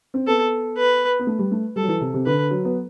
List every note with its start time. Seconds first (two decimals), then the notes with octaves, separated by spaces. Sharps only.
0.14 C4
0.27 B3 A4
0.77 B4
1.19 B3
1.27 A3
1.39 G3
1.52 A3
1.76 G3 A4
1.83 F#3
1.88 E3
2.01 C3
2.14 C3
2.26 D3 B4
2.51 F#3
2.65 B3